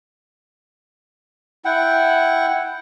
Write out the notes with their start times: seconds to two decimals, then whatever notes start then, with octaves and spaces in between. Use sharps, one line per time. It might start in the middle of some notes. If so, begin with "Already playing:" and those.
1.65 E4 F#5 G5